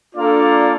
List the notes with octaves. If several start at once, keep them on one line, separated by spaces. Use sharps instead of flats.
A#3 D4 F4 A4 D5